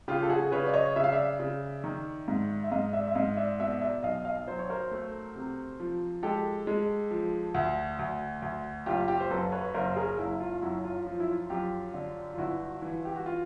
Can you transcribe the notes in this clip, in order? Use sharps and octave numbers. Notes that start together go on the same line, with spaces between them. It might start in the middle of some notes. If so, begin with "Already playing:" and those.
C#3 F4 G4
A4
F#4 G#4
C#3 B4 C#5
D5
C#5 D#5
C#3 E5
F5
D5 E5
C#3
D#3
G#2
E5
G#2 D#5 F5
D5 E5
E5
G#2 D#5 F5
D5 E5
B2 D5 E5
D5 E5
B1 D#5 F5
D#5 F5
F#3 C5
C#5
A#4 C5
A3
C3
F3
G#3 G4 A4
G#3
F3
D2
D2
D2
F#1 F4 G4
F4 G4
C5
F#2 A4 B4
B4 C#5
F#1 A#4 C5
G#4 A#4
F#1 E4
F4
F#2 E4 F#4
F4
F3 F4
E4
F4
F#2 F4 G4
D3
F4
G1 E4 F#4
E3
G4
F#4
F4